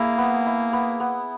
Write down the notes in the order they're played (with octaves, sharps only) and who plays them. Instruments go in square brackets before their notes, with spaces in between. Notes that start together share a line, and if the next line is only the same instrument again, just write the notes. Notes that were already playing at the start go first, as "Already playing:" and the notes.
Already playing: [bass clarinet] A#3 [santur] E4 G#4
[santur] B3
E4
B3
B3